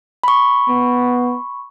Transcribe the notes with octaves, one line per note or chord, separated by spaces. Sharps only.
B5 C#6
B3